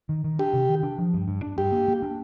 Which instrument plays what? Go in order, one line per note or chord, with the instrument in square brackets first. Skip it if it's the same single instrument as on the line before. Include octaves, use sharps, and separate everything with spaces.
[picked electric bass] D#3
D#3
[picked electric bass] D4 [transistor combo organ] G4
[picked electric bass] C3
D#3
D4
F3
G2
G2
D4
[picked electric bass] G2 [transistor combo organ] G4
[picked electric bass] A#3
A#3
D4